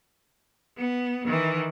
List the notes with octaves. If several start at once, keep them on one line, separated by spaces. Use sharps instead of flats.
B3
D#3 E3